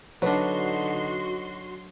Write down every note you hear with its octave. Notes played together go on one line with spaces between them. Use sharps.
D3 F#3 D4 D#4 F#4 B4 C#5 C6